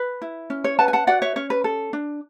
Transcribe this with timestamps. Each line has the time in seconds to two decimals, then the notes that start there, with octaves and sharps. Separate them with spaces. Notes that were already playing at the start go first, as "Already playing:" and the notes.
Already playing: B4
0.22 E4
0.50 C#4
0.64 C#5
0.79 B4 F#5 A5
0.88 G#5
0.93 F#5 A5
1.07 F#4 D5 F#5
1.22 C#5 E5
1.36 C#4 C#5
1.50 B4
1.64 A4
1.93 D4